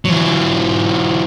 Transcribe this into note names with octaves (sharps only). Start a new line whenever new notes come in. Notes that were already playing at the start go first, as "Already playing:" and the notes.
E3 F#3